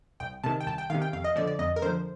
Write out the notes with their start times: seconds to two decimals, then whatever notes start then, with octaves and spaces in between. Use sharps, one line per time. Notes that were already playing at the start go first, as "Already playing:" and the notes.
0.20 C2 G5
0.44 C3 D#3 A5
0.61 G5
0.67 C2 A5
0.78 G5
0.90 D#3 F5
0.94 C3
1.02 G5
1.13 F2 F5
1.24 D#5
1.36 D3 F3 D5
1.47 D5
1.59 F2 D#5
1.76 A#4
1.82 D3 F3 C5